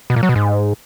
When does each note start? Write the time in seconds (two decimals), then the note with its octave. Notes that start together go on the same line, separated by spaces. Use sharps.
0.10 B2
0.16 A#2
0.23 F#3
0.29 B2
0.36 G#2